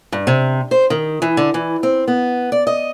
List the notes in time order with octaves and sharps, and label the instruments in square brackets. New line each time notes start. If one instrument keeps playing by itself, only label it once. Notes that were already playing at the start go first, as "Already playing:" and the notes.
[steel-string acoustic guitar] G2
C3
C5
D#3
E3
D3
E3
C4
B3
D5
D#5